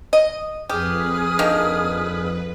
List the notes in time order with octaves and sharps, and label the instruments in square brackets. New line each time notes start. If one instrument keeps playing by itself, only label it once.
[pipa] D#5
[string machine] F2 B4 [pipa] G4 [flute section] G#4 D#6 F6
[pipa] D3 D#3 A#3